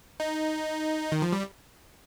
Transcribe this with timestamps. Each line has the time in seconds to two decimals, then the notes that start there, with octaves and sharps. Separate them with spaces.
0.20 D#4
1.12 D#3
1.22 F3
1.33 G3